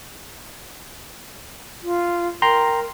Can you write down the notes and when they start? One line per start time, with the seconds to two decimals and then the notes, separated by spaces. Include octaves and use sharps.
1.83 F4
2.42 A#4 G5 A#5 C6